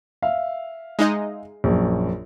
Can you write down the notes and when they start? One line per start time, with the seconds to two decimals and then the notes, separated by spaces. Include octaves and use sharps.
0.22 E5 F5
0.99 G#3 D#4 D#5
1.64 A#1 F#2